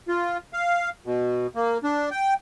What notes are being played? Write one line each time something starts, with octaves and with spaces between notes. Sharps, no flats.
F4
F5
B2
A#3
D4
G5